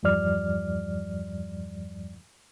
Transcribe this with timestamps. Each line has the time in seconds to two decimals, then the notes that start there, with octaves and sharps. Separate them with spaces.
0.03 E2 G2 F3 G3 D5 F6